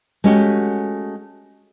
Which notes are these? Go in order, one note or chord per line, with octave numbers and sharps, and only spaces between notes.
G#3 A3 C#4 F#4 G4